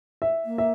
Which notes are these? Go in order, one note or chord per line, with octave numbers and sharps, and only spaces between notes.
E5
A#3
E5